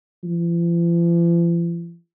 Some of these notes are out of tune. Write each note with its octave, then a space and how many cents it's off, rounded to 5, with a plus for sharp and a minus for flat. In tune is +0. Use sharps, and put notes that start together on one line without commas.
F3 -45